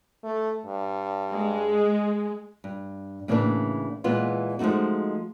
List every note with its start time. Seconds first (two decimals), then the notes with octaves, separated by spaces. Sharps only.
0.24 A3
0.66 G2
1.34 G#3
2.64 G2
3.28 A2 C#3 E3 A#3 C4 D4
4.04 A#2 E3 G#3 B3 F4
4.59 F3 G#3 A3 D#4 F#4